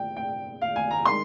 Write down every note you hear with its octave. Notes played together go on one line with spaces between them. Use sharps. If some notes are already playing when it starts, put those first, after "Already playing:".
Already playing: G5
G5
F5
G#5
A#5
D#3 G#3 C6